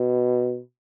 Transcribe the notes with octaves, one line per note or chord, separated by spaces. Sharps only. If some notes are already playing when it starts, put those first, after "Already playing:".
Already playing: B2